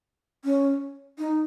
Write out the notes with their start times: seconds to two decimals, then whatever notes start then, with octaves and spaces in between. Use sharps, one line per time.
0.45 C#4
1.19 D#4